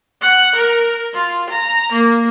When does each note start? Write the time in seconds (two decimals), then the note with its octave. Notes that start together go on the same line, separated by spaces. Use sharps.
0.21 F#5
0.55 A#4
1.14 F4
1.49 A#5
1.92 A#3